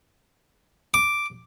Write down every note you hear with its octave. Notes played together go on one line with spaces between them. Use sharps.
D6